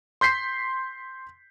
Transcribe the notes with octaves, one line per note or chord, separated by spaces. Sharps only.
C6 G6 B6 C7